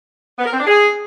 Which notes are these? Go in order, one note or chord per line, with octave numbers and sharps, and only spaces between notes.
B3
A#4
C4
D4
G#4